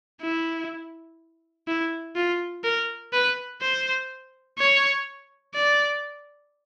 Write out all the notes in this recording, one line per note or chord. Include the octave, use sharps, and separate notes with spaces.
E4
E4
F4
A#4
B4
C5
C#5
D5